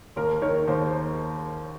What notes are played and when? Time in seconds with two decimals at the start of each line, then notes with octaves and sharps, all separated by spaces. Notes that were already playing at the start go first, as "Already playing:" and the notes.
0.16 D#2 A#4
0.42 D#3 A#4 C#5
0.67 D#2 C5